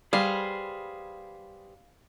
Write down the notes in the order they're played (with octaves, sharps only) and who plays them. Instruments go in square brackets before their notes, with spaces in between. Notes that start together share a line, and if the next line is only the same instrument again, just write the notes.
[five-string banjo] G3 [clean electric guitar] G#4 B4 C5 [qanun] F5